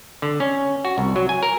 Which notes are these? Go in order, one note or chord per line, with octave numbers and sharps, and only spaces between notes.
D3
C#4
F#4
C2
F#3
G#5
A#4